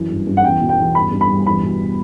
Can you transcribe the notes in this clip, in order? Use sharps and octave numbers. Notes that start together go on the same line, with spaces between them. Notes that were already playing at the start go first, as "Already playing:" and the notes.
Already playing: F#2 E3
G2
G2
F#5
E2 G5
B2
G5
E2
G2 B5
G2
B5
G2
E2 B5
B2